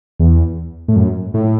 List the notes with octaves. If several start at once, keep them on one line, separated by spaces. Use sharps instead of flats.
E2
A2
F#2
A2